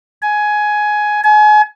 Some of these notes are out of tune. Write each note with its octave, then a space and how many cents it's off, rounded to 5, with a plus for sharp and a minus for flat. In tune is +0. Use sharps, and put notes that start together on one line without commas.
G#5 +15
G#5 +35